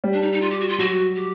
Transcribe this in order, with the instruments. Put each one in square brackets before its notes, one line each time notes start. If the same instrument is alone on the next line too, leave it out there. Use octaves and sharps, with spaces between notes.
[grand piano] G3
[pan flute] D4
D#4
D#4
F4
G4
F#4
F4
[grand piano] F#3 [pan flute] F#4
[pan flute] G4